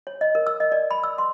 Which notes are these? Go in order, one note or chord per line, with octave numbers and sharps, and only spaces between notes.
C#5
D#5
A#4
E6
D#5
D5
B5
E6
C6